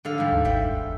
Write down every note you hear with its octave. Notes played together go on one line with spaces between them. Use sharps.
D3 A4 F5
G#2 G3
D#2
G1 E5 F#5 G5
E2